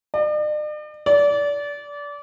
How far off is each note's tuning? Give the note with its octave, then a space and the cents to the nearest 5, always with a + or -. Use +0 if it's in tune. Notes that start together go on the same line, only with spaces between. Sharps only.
D5 +45
D5 -25